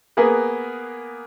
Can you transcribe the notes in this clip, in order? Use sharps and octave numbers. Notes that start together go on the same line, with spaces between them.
A#3 B3 G#4 A#4 B4